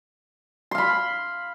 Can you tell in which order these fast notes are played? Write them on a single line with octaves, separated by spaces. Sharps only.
C6 F5 B5